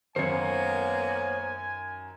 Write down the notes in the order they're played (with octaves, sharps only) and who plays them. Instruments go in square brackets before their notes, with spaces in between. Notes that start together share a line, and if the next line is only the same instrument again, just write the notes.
[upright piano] F#2 D#3 [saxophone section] A#3 B3 [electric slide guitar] C5 C#5 [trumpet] G#5